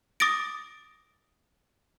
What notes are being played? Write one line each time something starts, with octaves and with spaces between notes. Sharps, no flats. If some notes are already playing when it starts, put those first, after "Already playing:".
D6 D#6 A6 A#6 D7